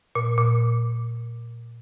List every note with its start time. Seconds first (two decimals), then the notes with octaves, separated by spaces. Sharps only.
0.15 A#2
0.38 A#2